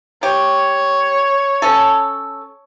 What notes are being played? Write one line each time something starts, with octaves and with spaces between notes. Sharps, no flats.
G4 C#5
C#4 A4